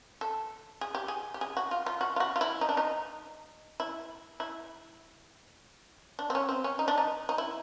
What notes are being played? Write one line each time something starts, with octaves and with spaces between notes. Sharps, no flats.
A4
G#4
G4
G#4
G4
G#4
F#4
F4
F4
F#4
F4
F#4
F4
E4
D#4
D4
D#4
E4
E4
D4
C4
C#4
C4
C#4
D#4
D4
D#4
D#4
E4